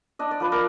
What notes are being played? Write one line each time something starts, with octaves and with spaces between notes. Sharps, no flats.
D4 D#5
D5
F3 B4
A#4 D5